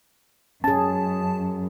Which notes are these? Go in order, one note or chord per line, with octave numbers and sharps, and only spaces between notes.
F#2 C#4 G#4 A5